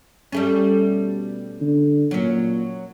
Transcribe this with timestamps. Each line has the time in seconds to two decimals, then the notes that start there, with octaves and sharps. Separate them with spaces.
0.32 G3 A3 C#4
0.80 B2
1.61 D3
2.11 A#2 F#3 C#4